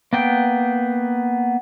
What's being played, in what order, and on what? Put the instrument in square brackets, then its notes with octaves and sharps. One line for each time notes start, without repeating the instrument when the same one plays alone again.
[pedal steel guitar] A#3 B3 G5